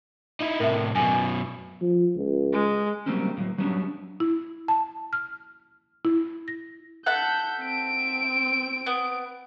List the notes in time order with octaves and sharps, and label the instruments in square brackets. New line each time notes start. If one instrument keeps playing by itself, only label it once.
[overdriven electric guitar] D#4 E4
[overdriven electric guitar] A2 C3 [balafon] A#4 E5
[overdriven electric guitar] F#2 B2 [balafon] G#5
[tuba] F3
C#2
[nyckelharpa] G#3
[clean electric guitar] F#3 G3 A3 A#3 C4 C#4
A2 F3 F#3
F#3 G3 B3 C#4 D4
[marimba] E4
A5
F6
E4
A#6
[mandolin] A4 E5 F#5 [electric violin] G6
[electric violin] C4 D7
[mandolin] B3